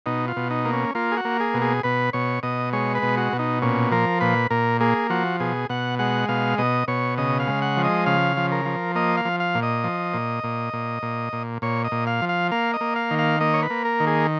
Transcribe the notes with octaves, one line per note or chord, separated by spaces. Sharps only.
B2 D#4
F4
B2
D#4
A#3
C#4
A#3 F4
G#4
F#4
A#3
G#4
B2
G#4
B2 B4
B2 C#5
B2 D#5
G#3 C#5
B4
B2
F#4
B2
D#4
A#2 C#4
F3 A#4
A#2 B4
A#2 A#4
A#3 G#4
F3 F#4
B2 G#4
B2 F#5
G#3 F#5
B2 F5
B2 D#5
B2 C#5
C#3 D#5
F5
G#3
F#5
F3
D#5
C#3 F5
F3
A#4
F3
A#3 D#5
F5
F3
F5
A#2
D#5
F3
A#2
A#2
A#2
A#2
A#2
A#2 C#5
D#5
A#2
F5
F3
F5
A#3 F5
D#5
A#3
F5
D#3
F5
A#3 D#5
C#5
B4
A#3
A#4
D#3
G#4